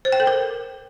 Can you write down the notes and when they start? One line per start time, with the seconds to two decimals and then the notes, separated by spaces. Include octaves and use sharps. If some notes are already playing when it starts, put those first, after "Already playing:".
0.05 C5
0.12 G5
0.20 A4
0.27 A#4